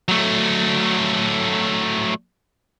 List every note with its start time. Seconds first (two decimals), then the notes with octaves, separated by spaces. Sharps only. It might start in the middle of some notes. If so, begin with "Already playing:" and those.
0.08 F#3 A3